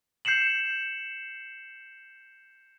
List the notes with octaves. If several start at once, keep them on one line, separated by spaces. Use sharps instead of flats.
G6 C7 C#7 E7 F#7